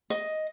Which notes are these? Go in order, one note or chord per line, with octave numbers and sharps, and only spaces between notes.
D#5